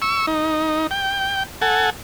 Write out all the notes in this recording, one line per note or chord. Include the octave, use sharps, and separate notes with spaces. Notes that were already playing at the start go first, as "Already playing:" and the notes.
C#6 E6
D#4
G5
A4 F#5 G#5